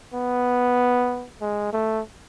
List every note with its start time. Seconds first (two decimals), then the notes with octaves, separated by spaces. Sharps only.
0.14 B3
1.41 G#3
1.73 A3